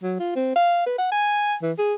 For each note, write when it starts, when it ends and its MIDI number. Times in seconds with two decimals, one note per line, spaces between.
0.03 0.19 54
0.20 0.35 65
0.36 0.52 60
0.56 0.84 77
0.86 0.94 71
0.98 1.09 78
1.12 1.55 80
1.63 1.72 52
1.79 1.95 68